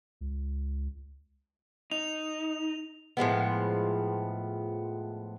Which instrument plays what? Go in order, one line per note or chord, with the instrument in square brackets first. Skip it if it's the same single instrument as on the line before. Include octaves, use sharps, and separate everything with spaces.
[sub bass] C#2
[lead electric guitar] D#4 [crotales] F7
[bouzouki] A2 F3 G#3 B3